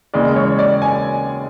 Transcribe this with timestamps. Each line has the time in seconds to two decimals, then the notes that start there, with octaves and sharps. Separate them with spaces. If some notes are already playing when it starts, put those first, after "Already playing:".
0.14 D#2 C#3 E3 G#3 D5
0.36 C#5
0.59 D5
0.82 G#5